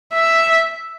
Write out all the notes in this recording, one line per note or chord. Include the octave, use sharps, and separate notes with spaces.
E5